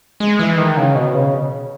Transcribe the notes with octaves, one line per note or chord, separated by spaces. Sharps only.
G#3
E3
D#3
C#3
B2
C#3